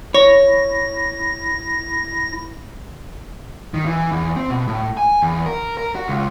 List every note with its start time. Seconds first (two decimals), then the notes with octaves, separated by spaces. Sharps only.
0.14 E4 C#5 A#6
3.74 D#3
3.86 E3
4.11 E2
4.36 C4
4.50 B2
4.68 A2
4.97 G#5
5.22 E2
5.46 A#4
5.77 A#4
5.95 F#4
6.08 C#2